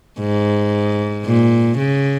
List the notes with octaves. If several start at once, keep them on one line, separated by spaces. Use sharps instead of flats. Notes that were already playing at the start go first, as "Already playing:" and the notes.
G#2
A#2
C#3